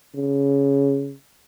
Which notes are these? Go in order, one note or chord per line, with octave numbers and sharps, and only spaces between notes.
C#3